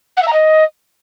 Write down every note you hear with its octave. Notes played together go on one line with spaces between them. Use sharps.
F#5
E5
A#5
D#5